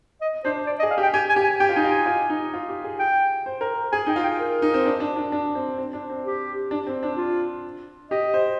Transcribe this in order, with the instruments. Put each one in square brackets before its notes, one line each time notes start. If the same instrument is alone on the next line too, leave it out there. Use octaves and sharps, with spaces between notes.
[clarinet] D#5
[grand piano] D4 [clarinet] C5
[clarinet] D5
D#5
[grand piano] G#4
[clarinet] F5
[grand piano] G4
[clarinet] G5
[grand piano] G4 [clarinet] G#5
[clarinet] G#5
[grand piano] G4
[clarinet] G#5
[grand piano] G4 [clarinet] G5
[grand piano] F4
[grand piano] D#4 [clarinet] G#5
[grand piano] F4
[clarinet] G#5
[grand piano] F4
D#4
F4
G4
G#4
[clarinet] G5
[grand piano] C5
A#4
[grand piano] G#4 [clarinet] G#5
[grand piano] D#4 [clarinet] G5
[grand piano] F4
[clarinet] G5
A#4
[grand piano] D#4
C4
D4
D4
D4
D4
C4
C4
D4
C4
[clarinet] G4
[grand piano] D4
C4
D4
[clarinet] F4
[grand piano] G4 [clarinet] D#5
[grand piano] C5